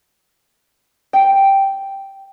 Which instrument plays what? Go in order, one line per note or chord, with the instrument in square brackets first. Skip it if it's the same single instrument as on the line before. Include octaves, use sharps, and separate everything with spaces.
[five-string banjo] G5